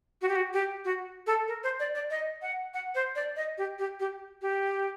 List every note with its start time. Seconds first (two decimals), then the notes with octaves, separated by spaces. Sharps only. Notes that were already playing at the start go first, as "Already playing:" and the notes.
0.22 F#4
0.29 G4
0.35 F#4
0.53 G4
0.85 F#4
1.27 A4
1.48 A#4
1.63 C5
1.80 D5
1.95 D5
2.10 D#5
2.42 F#5
2.74 F#5
2.95 C5
3.15 D5
3.36 D#5
3.58 G4
3.79 G4
4.00 G4
4.42 G4